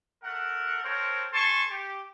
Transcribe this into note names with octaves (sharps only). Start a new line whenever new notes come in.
A3 A4 A#4 F#5
C4 A4 A#4 C5 C#5
A4 G#5 A5 C6 C#6
G4